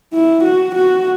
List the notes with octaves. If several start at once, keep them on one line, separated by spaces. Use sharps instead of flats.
E4
F#4
F#4